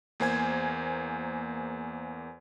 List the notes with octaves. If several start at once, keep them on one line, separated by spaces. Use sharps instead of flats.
E2 A#3 C5 G#5 G#6